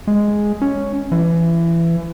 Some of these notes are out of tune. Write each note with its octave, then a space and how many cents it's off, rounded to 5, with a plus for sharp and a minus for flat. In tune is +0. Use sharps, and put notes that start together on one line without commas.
G#3 +0
C#4 +5
E3 +25